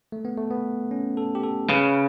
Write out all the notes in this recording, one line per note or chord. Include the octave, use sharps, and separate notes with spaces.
A3
B3
A3
B3
C#4
A4
G4
A4
C#3 B4